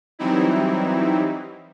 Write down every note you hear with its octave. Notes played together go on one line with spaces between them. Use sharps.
E3 F#3 G3 C4 D#4 E4